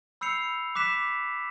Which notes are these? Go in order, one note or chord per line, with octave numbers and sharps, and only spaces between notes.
B5 E6 G6 C7 C#7 F7
D6 F#6 B6 E7